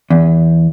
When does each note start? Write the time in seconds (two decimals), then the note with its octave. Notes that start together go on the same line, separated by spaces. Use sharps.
0.10 E2